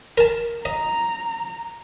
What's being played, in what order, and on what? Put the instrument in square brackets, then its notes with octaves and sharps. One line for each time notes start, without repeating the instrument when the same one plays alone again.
[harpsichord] A#4 A5
[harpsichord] D#5 [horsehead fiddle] A#5